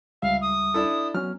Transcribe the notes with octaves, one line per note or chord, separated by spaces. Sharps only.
C#2 G3 E5 F5
D#6
D4 E4 A4
F#3 B3 C#4 F6